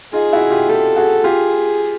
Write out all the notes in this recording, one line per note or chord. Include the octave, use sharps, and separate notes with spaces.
D#4 F4 G#4
E4 F#4
F4 G4
F4 G4 A4
F#4 G#4
F4 G4 G#4